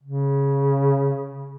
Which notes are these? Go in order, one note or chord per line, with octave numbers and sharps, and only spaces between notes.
C#3